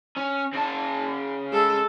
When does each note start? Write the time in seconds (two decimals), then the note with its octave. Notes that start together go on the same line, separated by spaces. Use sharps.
0.17 C#4
0.53 C#3 A5
1.52 G#3 A4